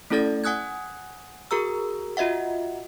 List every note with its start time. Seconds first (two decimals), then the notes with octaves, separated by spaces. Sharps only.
0.10 A3 C#4 E4 A4 D5 A6
0.44 F#5 G#5 D#6 F#6 G#6
1.51 F#4 G#4 A#4 A#5 E6
2.17 F4 F#4 D#5 E5 F#5